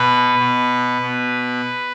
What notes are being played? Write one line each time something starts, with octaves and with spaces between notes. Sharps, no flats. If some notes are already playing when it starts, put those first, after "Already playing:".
Already playing: B2 B4
B2
B2